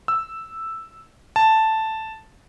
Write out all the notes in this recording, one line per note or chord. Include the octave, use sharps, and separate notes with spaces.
E6
A5